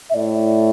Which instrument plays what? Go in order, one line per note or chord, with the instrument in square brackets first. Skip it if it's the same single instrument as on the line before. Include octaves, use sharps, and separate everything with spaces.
[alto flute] E5
[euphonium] A2 [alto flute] D5